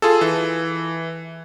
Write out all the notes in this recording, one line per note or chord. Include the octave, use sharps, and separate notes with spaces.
F4 G#4 A4
E3